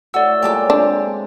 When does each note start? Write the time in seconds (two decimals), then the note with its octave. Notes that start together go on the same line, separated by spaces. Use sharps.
0.14 A2 F#4 C#5 D5 E6
0.42 A#2 F#3 G#3 G4 A5 D6
0.70 C4 D4